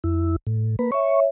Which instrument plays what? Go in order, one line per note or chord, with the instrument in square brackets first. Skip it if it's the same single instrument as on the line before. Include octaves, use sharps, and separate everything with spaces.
[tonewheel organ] F2 E4
A2
A#3 B4
[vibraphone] C#5 E5 [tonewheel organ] C#6